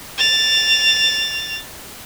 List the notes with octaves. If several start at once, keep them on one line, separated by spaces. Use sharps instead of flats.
A6 F7